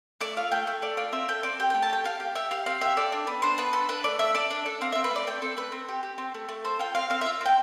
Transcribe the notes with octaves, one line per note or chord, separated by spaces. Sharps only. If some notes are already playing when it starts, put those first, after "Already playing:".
A3 D5
F4 F5
A3 G5
A3
A3 D5
F4 D5
C4 E5
A3 G5
C4 D5
G4 G5
G5
A3
A5
G4 G5
G4 F5
G4
G4 E5
G4 F5
C4 F5
G4 E5
A4 D5
D4
B3
D4 C5
B3 B4
A4 B4
D4 B4
A3 D5
A3 E5
A4 D5
D4
A4
C4 F5
C4 E5
B4
A3 D5
A3 G5
C4 A4
A3 B4
C4
G4
G4
C4
A3
A3
A4 C5
F4 G5
C4 F5
C4 F5
E5
F4
C4 G5